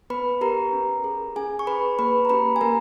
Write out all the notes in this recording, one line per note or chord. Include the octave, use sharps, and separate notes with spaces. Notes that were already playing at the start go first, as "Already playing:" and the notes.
B3 B4 B5
G4 A#4 A#5
C#4
G#4
C#4 G#4 G#5
C#6
G#4 B4 B5
A#3 B4 B5
A#5
C#4 G4 B4 B5
G#5
A#3 A#4 A#5